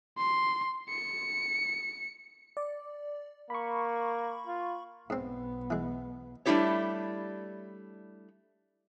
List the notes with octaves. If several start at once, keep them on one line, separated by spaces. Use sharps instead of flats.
C6
C#7
D5
A#3 B5 C#6
F4
B1 G#2 B3 C4
E3 G#3
G3 A3 D4 E4 G4 C#5